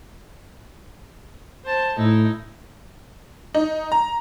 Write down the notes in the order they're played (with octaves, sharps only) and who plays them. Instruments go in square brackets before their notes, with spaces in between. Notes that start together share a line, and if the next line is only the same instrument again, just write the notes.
[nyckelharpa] C5 A5
[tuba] A2 [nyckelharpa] D#4 E4
[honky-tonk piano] D#4
A#5